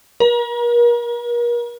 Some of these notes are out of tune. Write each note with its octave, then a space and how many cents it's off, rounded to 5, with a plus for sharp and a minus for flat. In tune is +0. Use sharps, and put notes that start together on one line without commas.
A#4 +40